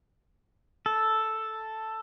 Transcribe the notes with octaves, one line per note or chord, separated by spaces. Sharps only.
A4